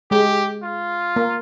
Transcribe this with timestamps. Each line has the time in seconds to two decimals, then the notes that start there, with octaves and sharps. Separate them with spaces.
0.11 G#3 G4
0.63 F4
1.16 A#3